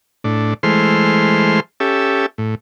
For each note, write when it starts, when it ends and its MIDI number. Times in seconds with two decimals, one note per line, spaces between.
0.24 0.54 45
0.24 0.54 62
0.63 1.60 52
0.63 1.60 56
0.63 1.60 57
0.63 1.60 72
0.63 1.60 84
0.63 1.60 89
1.80 2.26 61
1.80 2.26 67
1.80 2.26 69
1.80 2.26 76
2.38 2.55 45